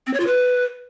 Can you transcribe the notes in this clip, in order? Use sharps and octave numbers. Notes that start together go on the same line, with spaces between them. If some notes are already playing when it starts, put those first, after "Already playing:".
C4
C#5
F4
B4